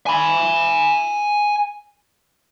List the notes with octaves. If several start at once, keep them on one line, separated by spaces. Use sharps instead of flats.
G#5 B5